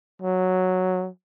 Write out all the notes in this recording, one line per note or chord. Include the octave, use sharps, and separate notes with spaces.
F#3